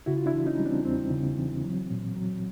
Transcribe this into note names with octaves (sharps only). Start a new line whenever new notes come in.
C#3 E4 F#4
F4
D4 E4
E3
C#4 D#4
G3
C4 D4
E2 C4
C#3
E3
F#3
A#2
F#3